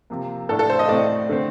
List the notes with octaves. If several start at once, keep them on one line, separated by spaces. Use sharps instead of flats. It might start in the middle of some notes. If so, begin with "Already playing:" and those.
C3 F3 A#3
A2 A3 D4 A4
A4
C5
D#5
A2 A3 C4 D5
D3 A3 C4